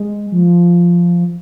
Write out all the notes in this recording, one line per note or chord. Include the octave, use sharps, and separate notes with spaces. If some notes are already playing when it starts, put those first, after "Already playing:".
Already playing: G#3
F3